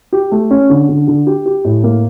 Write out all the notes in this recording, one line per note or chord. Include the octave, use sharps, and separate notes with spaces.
G4
A3
C#4
D3
D3
D3
G4
G4
A2
A#3